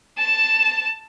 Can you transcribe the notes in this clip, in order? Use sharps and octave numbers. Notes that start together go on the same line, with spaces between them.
A5 E7